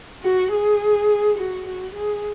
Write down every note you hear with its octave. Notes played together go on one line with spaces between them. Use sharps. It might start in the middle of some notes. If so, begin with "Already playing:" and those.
F#4
G#4
F#4
F#4
G#4